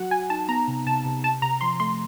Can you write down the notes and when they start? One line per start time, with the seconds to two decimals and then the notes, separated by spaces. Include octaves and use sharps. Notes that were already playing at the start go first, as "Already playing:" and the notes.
Already playing: F#3 F#4 F#5
0.10 F#4 G#5
0.30 D#4 A5
0.48 B3 A#5
0.68 C3
0.86 C3 A5
1.05 C3
1.24 C3 A5
1.42 C3 A#5
1.61 F3 C6
1.80 A3 C6